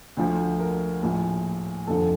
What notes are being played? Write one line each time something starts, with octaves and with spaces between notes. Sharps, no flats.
D2 D3 F3
A#4
A#1 A2 F3
F1 D#2 D3 F3 A4